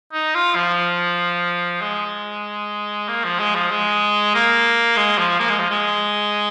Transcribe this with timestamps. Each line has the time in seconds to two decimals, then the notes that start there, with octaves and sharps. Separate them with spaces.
0.13 D#4
0.35 F4
0.55 F3
1.81 G#3
3.08 A#3
3.24 F3
3.39 G#3
3.55 F3
3.71 G#3
4.35 A#3
4.97 G#3
5.18 F3
5.39 A#3
5.49 G#3
5.59 F3
5.70 G#3